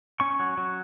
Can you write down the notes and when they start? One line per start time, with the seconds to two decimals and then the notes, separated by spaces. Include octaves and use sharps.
0.20 C#4 C#6
0.40 F#3
0.57 F#3